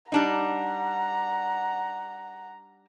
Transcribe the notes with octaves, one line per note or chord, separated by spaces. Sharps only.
G3 D4 D#4 F#5 A#5